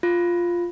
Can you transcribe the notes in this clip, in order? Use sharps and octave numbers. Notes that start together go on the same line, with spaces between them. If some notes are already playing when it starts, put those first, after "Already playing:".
F4